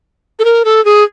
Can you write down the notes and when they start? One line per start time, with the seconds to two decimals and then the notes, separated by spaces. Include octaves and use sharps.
0.39 A4
0.45 A#4
0.65 A4
0.85 G#4